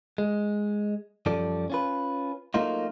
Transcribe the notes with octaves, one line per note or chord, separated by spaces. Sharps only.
G#3
F#2 F3 G3 A4 D5
C#4 F4 B4
F#3 A3 A#3 D#4 F4